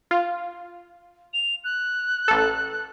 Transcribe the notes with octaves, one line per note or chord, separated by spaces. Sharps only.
F4
F7
F#6
A1 A4